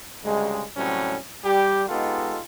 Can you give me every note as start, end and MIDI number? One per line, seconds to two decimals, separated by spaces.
0.24 0.63 38
0.24 0.63 49
0.24 0.63 55
0.24 0.63 56
0.76 1.17 45
0.76 1.17 48
0.76 1.17 54
0.76 1.17 55
0.76 1.17 60
0.76 1.17 61
1.44 1.84 55
1.44 1.84 67
1.89 2.39 56
1.89 2.39 59
1.89 2.39 63
1.89 2.39 65
1.89 2.39 67
1.89 2.39 69